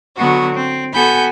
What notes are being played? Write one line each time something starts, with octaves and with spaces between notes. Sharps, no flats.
D3 F#3 B3 F#4
C4
B3 F#4 A4 G#5 B5 G6